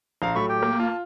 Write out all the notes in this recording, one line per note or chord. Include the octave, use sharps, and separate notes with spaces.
A#1 F5 A#5
A2 F#3 A3 B5 C#6
G4 G5
A#3
F4 A5